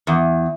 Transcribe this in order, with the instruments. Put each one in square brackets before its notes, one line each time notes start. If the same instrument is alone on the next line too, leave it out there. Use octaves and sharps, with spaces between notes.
[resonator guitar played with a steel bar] E2